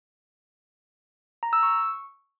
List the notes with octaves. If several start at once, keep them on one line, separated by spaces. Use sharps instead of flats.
A#5
E6
C#6